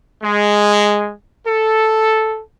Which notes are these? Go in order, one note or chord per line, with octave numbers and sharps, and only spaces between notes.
G#3
A4